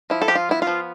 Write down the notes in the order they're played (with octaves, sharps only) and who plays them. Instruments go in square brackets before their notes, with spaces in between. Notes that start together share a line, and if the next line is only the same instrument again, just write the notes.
[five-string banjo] F3 E4
A4
F3 G4
F4
B3 E4
F4
F3